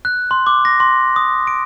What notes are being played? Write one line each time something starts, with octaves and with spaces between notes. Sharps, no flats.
F#6
C6
D6
A#6
C6
D#6
D7